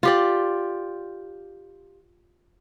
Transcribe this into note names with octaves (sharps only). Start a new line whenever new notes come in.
F4 G4 D5